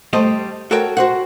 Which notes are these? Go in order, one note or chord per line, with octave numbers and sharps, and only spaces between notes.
G3 A3 C5 D#5
F#4 A4 A#4 C#5 G5
F#4 C5 F#5